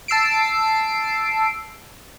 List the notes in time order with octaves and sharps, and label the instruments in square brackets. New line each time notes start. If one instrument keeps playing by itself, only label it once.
[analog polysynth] A5 E6 C7 D7